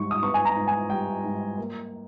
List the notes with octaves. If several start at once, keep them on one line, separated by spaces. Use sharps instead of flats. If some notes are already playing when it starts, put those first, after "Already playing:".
Already playing: G#2 G3 C#6
D#6
B3 C#6
G#5
A#5
G#2
G#5
G3 G5
G#2
A#3